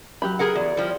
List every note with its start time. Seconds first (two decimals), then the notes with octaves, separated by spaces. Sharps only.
0.22 F#3 G4 B5
0.39 G#4 A#4 F#5
0.55 E2 D5
0.77 F3 G3